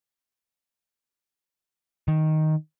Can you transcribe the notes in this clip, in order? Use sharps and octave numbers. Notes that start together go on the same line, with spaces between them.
D#3